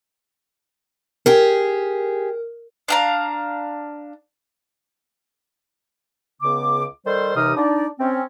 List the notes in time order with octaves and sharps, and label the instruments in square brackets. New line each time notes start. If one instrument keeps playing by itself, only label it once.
[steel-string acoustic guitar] G4 G#4 [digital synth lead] A#4
[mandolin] D4 F5 A#5
[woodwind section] C#2 C#3 B3 D6
D#3 G3 A4 C5
D#2 C3 E3 D#4 D#6 F6
D4 D#4 D5
C4 C#4